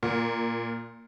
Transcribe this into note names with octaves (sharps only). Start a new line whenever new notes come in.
A#2